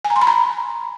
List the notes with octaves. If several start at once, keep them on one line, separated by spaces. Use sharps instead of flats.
G#5
A#5
C6
B5
A#5